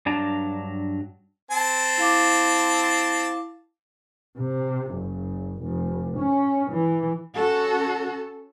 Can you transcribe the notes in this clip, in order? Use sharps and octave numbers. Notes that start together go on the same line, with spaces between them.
G2 F#3 D4 A5 A#5
C4 A5
E4 F5 D6
C3
F#1
F1
C#4
E3
C#4 F#4 A4